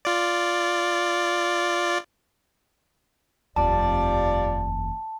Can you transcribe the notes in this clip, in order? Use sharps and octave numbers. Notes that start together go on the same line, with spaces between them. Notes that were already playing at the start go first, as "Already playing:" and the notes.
F4 D5
F1 D#2 F3 G3 D5 A5